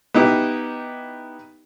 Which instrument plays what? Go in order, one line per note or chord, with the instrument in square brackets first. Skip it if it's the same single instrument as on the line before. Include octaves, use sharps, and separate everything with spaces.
[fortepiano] B3 D#4 E4 G4